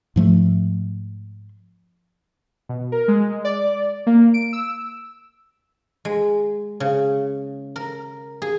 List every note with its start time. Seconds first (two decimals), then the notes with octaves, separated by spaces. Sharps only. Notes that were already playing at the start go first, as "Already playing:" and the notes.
0.16 G#2 F3 A3
2.69 B2
2.92 A#4
3.08 G#3
3.45 D5
4.07 A#3
4.34 D7
4.53 E6
6.05 G#3
6.80 C#3
7.76 A#4
8.42 G#4